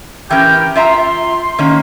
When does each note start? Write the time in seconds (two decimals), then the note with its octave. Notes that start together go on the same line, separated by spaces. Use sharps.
0.30 E3 C#4 G4 A#4 G5
0.75 F4 E5 A#5 C6
1.59 D#3 A#3 C#4